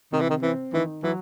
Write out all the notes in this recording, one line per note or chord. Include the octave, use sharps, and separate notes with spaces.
C3 D#3
E3
D#3
E3 C4
D#3 E3
E3 F#3